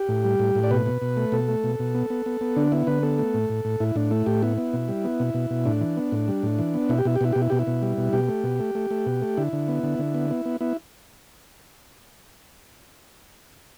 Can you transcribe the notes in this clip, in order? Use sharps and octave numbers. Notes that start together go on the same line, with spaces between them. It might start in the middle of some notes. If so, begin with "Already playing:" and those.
Already playing: G4
A2
G3
A2
A2
D5
B2 B4
B2
B2
A3
B2 A4
A3
B2
B2
B3
B3
B3
B3
D3 D4
B3 E4
D3 B4
B3 A4
A3
A2
A2
A2
A2 E4
A2 D4
A3 E4
A2 G4
B3 E4
B3
B2
G3
B3
B2
B2
B2
A2 D4
E3
B3
A2
G3
A2
E3
B3
B2 E4
G4
B2 E4
G4
B2 E4
B2 G4
E4
B2 G4
E4
B2
G3
B2
B2 G4
A3
B2
A3
A3
A3
B2
A3
D3 E4
D3
B3
D3
D3
B3
B3
B3
B3 E4